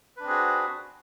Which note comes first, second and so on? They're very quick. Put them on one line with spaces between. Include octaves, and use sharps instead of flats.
B4 D4 C4 G#4 F#4